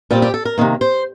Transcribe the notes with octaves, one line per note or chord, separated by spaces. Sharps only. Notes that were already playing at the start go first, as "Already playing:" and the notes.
A#2 G3 C4 G4
G4
A4
A#4
C3 D#3 A#3
C5